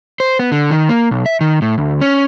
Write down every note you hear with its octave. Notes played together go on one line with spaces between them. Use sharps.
C5
B3
D3
D#3
A#3
B1
E5
D#3
A2
D2
C#4